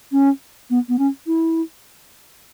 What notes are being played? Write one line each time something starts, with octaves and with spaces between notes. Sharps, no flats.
C#4
B3
B3
C#4
E4